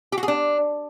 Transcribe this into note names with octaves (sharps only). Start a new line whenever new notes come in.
G4
F#4
G#4
D4